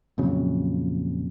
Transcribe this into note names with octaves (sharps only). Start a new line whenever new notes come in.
A#1 F2 C#3 F#3